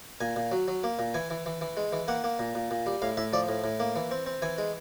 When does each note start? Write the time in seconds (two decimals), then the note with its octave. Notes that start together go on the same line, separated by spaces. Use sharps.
0.21 A#2 G#5
0.36 A#2
0.52 F#3
0.68 F#3
0.84 A#3
0.99 A#2
1.14 E3 G#5
1.30 E3
1.46 E3
1.61 E3
1.77 G#3
1.93 E3
2.08 A#3 F#5
2.24 A#3
2.39 A#2
2.55 A#2
2.71 A#2
2.86 G3
3.02 A2 F5
3.17 A2 E5
3.33 F3 D5
3.48 A2
3.64 A2
3.80 A#3
3.96 E3
4.11 C4
4.26 C4
4.42 E3 G#5
4.58 G#3